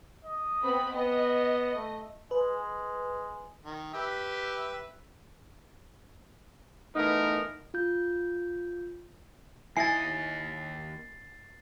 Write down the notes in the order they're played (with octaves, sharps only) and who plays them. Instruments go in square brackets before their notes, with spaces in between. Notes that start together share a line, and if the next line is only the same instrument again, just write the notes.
[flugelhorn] D#5
[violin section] B3 C4 B5
[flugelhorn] B3 [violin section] D#5
[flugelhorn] A3
[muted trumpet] G#3 [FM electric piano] B4
[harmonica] D#3
G4 B4 E5
[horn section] E3 A3 B3 D#4 A#4
[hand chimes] F4 G6
[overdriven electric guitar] D#2 D#5 [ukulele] E4 [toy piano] G#5 [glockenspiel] A6 C7